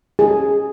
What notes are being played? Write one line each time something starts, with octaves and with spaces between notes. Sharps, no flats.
G#4